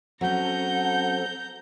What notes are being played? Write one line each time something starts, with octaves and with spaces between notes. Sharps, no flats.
F#3 C4 C#4 A4 F#5 A#5 G6